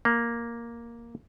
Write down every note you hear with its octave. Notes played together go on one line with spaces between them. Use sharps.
A#3